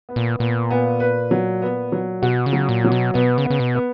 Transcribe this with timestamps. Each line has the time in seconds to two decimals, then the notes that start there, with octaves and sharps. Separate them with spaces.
0.09 B3
0.16 A#2
0.39 A#2 B3
0.71 B3
1.00 B4
1.31 F#3
1.62 B3
1.92 F#3
2.22 B2 F#4
2.46 C#3
2.53 F#3
2.69 A#2
2.84 F#3
2.92 B2
3.14 B2 B3
3.38 C#3
3.45 B3
3.50 C#3
3.60 B2
3.75 B3